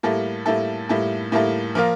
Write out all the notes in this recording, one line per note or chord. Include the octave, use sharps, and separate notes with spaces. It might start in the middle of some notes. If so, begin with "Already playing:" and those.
A2 G3 A#3 E4 A4
A2 G3 A#3 E4 A4
A2 G3 A#3 E4 A4
A2 G3 A#3 E4 A4
F3 A#3 F4 A#4